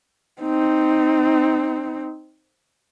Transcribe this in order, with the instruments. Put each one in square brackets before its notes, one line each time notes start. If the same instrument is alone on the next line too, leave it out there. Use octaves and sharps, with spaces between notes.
[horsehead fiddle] C4 D#4